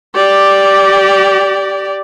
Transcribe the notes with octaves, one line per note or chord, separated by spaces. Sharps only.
G4 D5